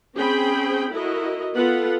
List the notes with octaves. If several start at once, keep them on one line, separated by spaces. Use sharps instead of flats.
C4 C#4 G#4 C5 G5 B5
E4 F#4 A4 A#4 D#5
B3 F4 A4 B4 F#5